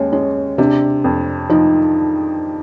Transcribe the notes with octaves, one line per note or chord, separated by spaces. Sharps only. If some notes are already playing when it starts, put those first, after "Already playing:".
Already playing: D#2 G#3 C#4
G#3 C#4
C3 D4
F2
F3 D#4